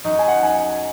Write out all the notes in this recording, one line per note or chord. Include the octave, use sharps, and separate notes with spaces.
F#2 F#3 D#4 F#4 D#5
G#5
F#5
G#5